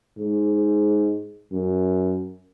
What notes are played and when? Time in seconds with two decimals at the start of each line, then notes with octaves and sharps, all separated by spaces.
0.18 G#2
1.52 F#2